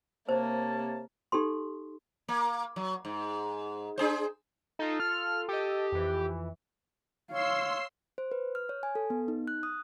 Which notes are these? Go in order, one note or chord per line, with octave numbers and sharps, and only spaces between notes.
C3 A#3 C5 C#5 A5
D#4 G4 A4 C6
A#3
F#3
G#2
D4 G#4 C5
D#4 F4 A4
F6
G4 A4 D#5
F2 E3
C#5 F5 C6 E6 C7
C5
B4
F6
C#5
G#5
A4
B3
D#4
F#6
D#6